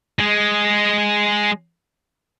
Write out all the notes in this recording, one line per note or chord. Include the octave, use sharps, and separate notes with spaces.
G#3 G#4